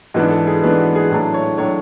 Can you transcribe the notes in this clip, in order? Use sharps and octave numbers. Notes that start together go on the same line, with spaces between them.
G#2 E3 B3 D4 F#4
A4
G#4
G#2 E3 B3 D4 B4
F#4
G#4
A2 F#3 A3 D4 A4
C#5
A2 F#3 A3 D4 C#5